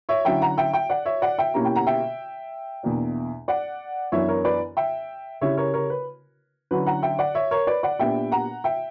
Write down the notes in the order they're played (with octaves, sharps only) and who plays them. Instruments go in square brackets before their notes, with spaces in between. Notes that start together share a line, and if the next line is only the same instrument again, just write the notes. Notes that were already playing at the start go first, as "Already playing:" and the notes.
[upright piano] C#5 E5
D3 F#3 C#4 E4 E5 G5
F#5 A#5
E5 G5
E5 G5
D5 F#5
C#5 E5
D5 F#5
E5 G5
B2 G3 A#3 C#4 E4 A#5
G5
F#5 A#5
E5 G5
E2 B2 A#3 D4
D5 F#5
F#2 E3 B3 D4 C#5 E5
A#4 C#5
B4 D5
E5 G5
C#3 G3 C#4 E4 C#5 E5
A#4 C#5
A#4 C#5
B4
D3 F#3 C#4 E4 B4
F#5 A#5
E5 G5
D5 F#5
C#5 E5
A#4 C#5
B4 D5
D5 F#5
A#2 G3 B3 D4 E5 G5
F#5 A#5
E5 G5